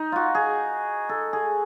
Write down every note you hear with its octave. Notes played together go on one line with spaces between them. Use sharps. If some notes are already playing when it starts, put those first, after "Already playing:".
Already playing: D#4
F4 F#4
G#4
A4
G#4